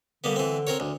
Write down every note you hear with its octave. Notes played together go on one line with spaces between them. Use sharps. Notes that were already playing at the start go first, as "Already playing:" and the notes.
D3 G3 A#3 B3
E3 C4
C4 A#4 C#5
D2